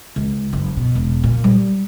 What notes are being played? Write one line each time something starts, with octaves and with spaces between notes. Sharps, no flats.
C#2
F#1
B2
E1
A#2
G3